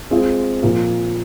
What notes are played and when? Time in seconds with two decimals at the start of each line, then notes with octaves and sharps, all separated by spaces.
0.10 G#3 C4 F4 G#4
0.63 A#2 F3 A#3